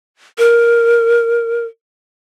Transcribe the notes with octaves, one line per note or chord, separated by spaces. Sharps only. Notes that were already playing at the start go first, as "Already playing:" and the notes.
A#4